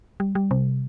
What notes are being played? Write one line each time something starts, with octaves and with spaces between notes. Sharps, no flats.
G3
G3
C3